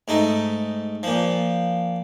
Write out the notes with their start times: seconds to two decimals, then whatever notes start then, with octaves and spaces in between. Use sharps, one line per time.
0.08 G#2 A3 D#4
1.03 A#2 F3